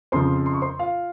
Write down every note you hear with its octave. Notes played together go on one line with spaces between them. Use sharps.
F2 C#3 F3 C5 C6
C6
C#6
C5 C6
F4 F5